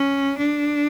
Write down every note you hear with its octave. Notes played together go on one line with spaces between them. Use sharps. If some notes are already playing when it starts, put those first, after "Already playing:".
Already playing: C#4
D4